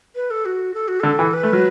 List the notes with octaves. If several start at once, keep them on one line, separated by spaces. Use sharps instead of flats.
B4
A4
F#4
A4
F#4
D3 A4
E3
B4
A3
F#3